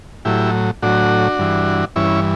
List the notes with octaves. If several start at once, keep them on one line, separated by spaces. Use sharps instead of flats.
A2 F#3 E4 G4
A2 F#3 D4 F#4
G2 E3
G2 E3 C#4 E4